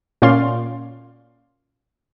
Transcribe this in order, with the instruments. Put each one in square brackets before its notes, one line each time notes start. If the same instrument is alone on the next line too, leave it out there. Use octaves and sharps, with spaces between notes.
[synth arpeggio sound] A#2 C#4 D5 F5 C6